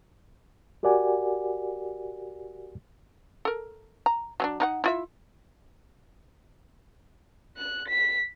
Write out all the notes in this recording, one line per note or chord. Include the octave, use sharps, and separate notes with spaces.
F#4 G4 A#4 D5 F#5 G#5
A4 A#4
A#5
F#3 C#4 D4
D#4 A#4 F#5
E4 F4 E5
F#6
B6